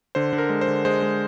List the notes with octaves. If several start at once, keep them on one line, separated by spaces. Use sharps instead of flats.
D3 C5
D3
A#4
G#3
C5
D3
G#3 C5
G#3